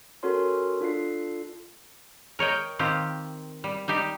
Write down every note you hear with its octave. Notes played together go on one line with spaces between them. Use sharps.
C#4 F#4 A4 A#4 C#5 C6
D4 F4 A4 C7
A#4 C#5 D#5 G5
D#3 C4 F4 G4
G3
G3 D#4 G4